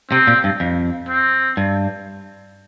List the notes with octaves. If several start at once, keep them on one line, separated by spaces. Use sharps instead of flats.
C3 C4
A#2
G2
F2
C4
G2